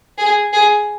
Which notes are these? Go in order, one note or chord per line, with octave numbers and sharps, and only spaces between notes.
G#4
G#4